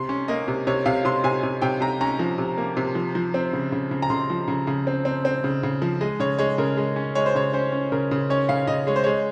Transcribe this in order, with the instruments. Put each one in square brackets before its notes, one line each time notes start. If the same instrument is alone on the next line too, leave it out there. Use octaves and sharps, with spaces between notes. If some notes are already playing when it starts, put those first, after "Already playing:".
Already playing: [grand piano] C3 C6
C#4
A#3 D#5
C3
C3 C#5
C3 F5
C3 C6
C3 G#5
C3
C3 G5
C3 A#5
C#4 A#5
F3
C3
A#3
C3
F3
F3
C4
C#3
C#3
C#3
A#5
C#3 C6
F3
C#3
C#3
C4
C4
C4
C#3
C#3
F3
G#3 D#5
C#3 C#5
G#3 C#5
C#3 A#4
G#3
C#4
G#3 C#5
C5
C#3 C#5
C#4 C5
C#4
C#3 A#4
C#3
C#4 C#5
C#3 F5
C#3 D#5
G#3 C#5
C5
G#3 C#5